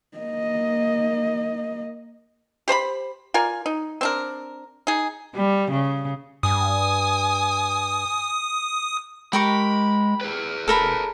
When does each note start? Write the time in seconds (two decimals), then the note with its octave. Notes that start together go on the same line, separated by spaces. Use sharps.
0.18 A#3 D#5
2.68 G4 C5 A#5 B5
3.34 F4 A#4 D5 G#5
3.66 D#4
4.01 C4 D4 A#4
4.87 D#4 G#4
5.35 G3
5.71 C#3
6.43 G2 G#5 D#6
9.33 G#3 G4 A#4 B5 C#6
10.21 G#4 B4
10.68 E1 A4 A#4 B5